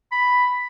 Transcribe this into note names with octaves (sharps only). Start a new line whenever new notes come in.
B5